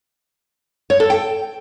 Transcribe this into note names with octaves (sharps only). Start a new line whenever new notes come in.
C#5
A4
G5